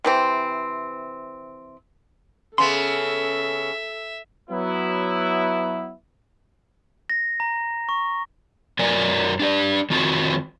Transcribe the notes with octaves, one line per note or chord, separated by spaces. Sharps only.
C3 E3 C4
C#3 B3 A4 E5 C6
F#3 B3 E4
A#6
A#5
C#6
F#2 F#3 A#4 D5 G#5
D4 G4 D5
F2 D#3 C4 F4 F#4 A5